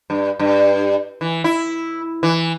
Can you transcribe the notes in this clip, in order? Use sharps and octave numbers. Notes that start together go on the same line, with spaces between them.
G2
G2
E3
E4
E3